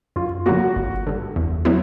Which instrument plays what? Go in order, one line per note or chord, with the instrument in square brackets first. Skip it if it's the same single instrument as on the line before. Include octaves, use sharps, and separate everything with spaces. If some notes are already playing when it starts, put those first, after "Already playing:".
[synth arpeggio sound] F#2 [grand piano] F4
[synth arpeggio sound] D3 F#3 A#3 [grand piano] F#4
[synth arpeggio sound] G1
G2 D3
E2
F#3 B3 E4